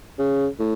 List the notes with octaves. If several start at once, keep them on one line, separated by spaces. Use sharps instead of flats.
C#3
A2